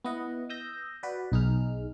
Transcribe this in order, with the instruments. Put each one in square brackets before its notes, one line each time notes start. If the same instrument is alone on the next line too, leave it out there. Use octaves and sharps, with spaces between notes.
[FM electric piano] B3 E4 D#5 F#5
D#6 E6 G6 A#6
F#4 B4 D5
B1 D#4 G#4 F6